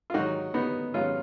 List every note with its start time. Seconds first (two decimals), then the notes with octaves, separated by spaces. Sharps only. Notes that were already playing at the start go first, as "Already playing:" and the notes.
0.10 F4
0.14 G#2 D#3 F#3 D#4 F#4
0.54 B3 D#4
0.94 G#2 D#3 F#3 C#4 F4